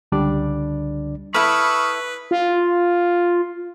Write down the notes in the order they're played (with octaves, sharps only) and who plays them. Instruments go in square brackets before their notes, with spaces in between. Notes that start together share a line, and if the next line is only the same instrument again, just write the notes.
[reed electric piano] C#2 D3 G3 D4 D5
[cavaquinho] E4 A4 [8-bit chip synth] B4 [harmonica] E5 C#6 D#6 [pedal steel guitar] B5 F6
[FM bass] F4